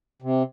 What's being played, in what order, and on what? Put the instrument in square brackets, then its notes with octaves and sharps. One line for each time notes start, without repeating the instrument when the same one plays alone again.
[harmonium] C3